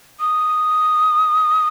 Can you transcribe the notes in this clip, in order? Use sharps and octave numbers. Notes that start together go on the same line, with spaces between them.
D#6